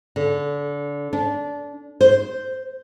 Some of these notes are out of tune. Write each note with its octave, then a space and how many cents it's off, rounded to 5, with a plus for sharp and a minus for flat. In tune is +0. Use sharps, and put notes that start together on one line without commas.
D3 -25
D4 -20
C5 -5